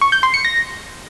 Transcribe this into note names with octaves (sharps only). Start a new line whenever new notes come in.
C#6
G6
C6
C#7
A#6